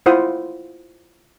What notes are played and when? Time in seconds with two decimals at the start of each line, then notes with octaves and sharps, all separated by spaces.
0.06 E4 F4 C5 F#5 D#6